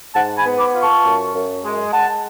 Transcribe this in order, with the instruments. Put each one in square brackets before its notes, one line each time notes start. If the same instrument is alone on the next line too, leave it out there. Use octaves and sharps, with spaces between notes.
[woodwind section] G#2 F#5 A5
G#5 B5
B3
B5 D6
F4
A5 C#6
F#2
F#2
G#3
G#3 F#5 A5